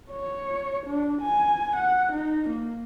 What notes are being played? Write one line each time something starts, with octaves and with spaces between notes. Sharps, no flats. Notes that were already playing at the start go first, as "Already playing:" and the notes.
C#5
D4
G#5
F#5
D#4
A#3